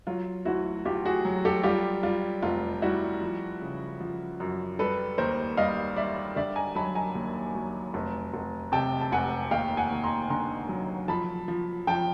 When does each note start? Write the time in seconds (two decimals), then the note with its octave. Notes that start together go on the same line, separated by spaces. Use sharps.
0.07 F#3 F4
0.45 D2 E4 F#4
0.85 D2 F4 G4
1.05 F#4 G#4
1.25 F#3
1.45 G4 A4
1.63 G3 F4 G4
2.03 G3 F4
2.43 F1 F4
2.82 G3 E4 F#4
3.21 F3
3.61 C#3
4.00 F3
4.40 F#2
4.79 G3 A4 B4
5.18 D#2 A#4 C5
5.57 G3 D#5 F5
5.96 G3 D5 E5
6.36 D3 D5 E5
6.56 G#5 A#5
6.75 F#3 A5 B5
6.95 G#5 A#5
7.15 D#2
7.55 F#3
7.94 F1
8.34 F1
8.72 C3 G5 A5
9.01 A5
9.12 F1 F#5 G#5
9.51 D#2 F5 G5
9.77 F#5 G#5
9.90 D#2
10.04 A#5 C6
10.30 D3 A#5 C6
10.69 F#3
11.08 F3 A5 B5
11.48 F3
11.87 F3 G5 A5